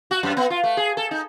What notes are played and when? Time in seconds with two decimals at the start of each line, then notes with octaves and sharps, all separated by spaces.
0.11 F#4
0.23 F#2
0.37 B3
0.50 F4
0.63 A3
0.77 G#4
0.97 A4
1.11 D#4